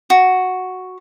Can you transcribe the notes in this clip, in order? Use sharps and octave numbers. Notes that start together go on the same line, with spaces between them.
F#4